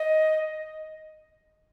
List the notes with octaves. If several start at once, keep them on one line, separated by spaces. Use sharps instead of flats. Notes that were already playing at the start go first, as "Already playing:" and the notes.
Already playing: D#5